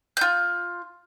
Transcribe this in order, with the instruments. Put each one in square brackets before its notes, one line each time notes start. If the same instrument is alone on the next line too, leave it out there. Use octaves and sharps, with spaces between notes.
[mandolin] F4 G6